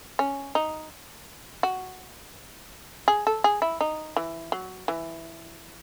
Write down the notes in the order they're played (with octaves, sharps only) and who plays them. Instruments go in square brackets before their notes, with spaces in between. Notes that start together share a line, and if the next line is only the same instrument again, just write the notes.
[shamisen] C#4
D#4
F#4
G#4
A4
G#4
E4
D#4
E3
F#3
E3